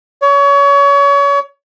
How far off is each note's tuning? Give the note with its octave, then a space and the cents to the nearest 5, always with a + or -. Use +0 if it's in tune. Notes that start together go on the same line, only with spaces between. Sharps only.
C#5 +30